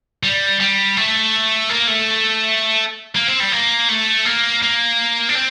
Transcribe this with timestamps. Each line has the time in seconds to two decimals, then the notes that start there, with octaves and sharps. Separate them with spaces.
0.23 G3
0.60 G3
0.97 A3
1.69 A#3
1.87 A3
3.15 A#3
3.28 C4
3.40 G3
3.52 A#3
3.89 A3
4.25 A#3
4.62 A#3
5.29 D4
5.35 C4